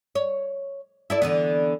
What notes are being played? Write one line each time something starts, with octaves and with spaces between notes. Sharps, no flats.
C#5
E4 A4 D5
D3 E3 B3